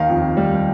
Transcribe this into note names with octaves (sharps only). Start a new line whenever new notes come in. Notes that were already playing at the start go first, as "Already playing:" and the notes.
Already playing: D#2 D#3 F5
F2
G3